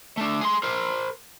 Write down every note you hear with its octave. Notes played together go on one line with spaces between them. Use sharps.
A3 D4
G#4 C6
A#4 C5